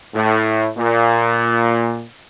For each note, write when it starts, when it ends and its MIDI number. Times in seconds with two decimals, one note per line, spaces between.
0.15 0.69 45
0.77 2.05 46